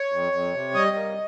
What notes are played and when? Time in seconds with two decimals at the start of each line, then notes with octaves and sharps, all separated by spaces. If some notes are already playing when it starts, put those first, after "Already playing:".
Already playing: C#5
0.12 F2
0.32 F2
0.54 C3
0.74 G3 D#5
0.95 A#3